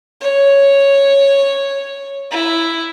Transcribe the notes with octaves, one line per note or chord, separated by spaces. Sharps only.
C#5
E4